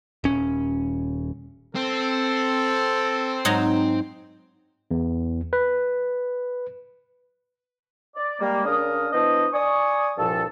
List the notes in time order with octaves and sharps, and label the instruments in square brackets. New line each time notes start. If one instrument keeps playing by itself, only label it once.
[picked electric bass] D#1 C#4
[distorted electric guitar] C4 [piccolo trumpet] A4
[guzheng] G#2 F#3 D#4
[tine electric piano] E2
B4
[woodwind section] D5
G3 G#3 A#3
C#3 D4 A#4 D5 F5 D#6
E3 B3 D4 C5 D#5
D5 G#5 C#6 D#6
C2 G2 A#2 F3 A4